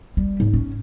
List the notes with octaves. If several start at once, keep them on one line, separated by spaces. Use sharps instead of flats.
G3
G#2
C#4